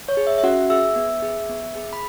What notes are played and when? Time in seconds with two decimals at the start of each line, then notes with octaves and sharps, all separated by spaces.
0.09 C#5
0.17 G#4
0.27 E5
0.38 E5
0.44 C#4 F#4 F#5
0.70 G#4 E5 E6
0.96 B3
1.22 G#4
1.49 B3
1.76 G#4
1.93 B5